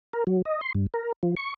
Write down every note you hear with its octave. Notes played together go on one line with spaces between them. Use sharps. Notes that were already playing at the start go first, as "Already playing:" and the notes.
A#4
F#3
D#5
C6
G2
A#4
F3
C#6